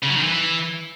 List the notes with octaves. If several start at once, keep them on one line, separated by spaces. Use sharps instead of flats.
C#3
F#3
D#3
E3